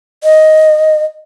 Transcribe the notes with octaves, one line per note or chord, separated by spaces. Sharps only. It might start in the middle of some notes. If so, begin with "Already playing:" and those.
D#5